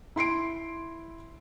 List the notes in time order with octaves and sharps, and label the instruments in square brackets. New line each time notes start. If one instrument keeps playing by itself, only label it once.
[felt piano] E4 C6 C7 D7